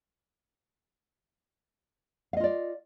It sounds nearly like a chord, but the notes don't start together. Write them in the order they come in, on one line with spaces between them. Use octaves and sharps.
F5 D#5 F4 D5